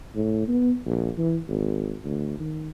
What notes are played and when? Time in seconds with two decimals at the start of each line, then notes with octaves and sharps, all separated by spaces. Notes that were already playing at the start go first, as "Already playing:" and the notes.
0.15 A2
0.48 B3
0.86 A#1
1.18 E3
1.49 G#1
2.04 D2
2.39 D#3